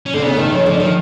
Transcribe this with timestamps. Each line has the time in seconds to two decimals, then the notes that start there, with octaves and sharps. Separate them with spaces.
0.06 C#4
0.14 D3 C4
0.22 C#3 B3
0.37 D#3 A3
0.51 C#3 F3
0.65 D3 F3
0.80 D#3 F3